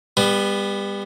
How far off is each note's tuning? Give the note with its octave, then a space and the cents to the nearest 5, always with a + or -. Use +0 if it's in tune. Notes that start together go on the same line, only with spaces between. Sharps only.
G3 +30 B3 +0